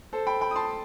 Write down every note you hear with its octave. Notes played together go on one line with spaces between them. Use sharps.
A4 C5
G5 B5
G5 B5
D#6
A5 C6